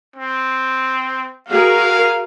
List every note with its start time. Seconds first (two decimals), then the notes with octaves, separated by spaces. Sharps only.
0.16 C4
1.48 F#4 G#4 A#4 F5